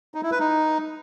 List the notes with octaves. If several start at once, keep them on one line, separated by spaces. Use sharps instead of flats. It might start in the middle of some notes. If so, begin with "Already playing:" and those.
D#4
E4
B4
D#4